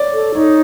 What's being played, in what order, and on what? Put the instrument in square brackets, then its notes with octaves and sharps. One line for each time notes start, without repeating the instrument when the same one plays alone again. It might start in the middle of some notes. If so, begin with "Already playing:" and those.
Already playing: [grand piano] C#5 D5
[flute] A4
[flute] D#4 [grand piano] C#5